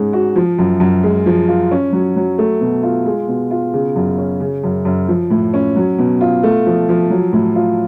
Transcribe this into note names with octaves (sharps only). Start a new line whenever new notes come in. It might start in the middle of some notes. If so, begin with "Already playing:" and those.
Already playing: G#2 G#3 C#4
F#4
F3
F#2
F#2
G#3
F3
F4
C#4
F#3
F#3
A3
B2
F4
G#3
B2
F4
C#3
F#2
C#4
C#3
F#2
F#2
F3
A2
C#4
F#3
B2
F4
A3
F3
F3
F#3
A2
F4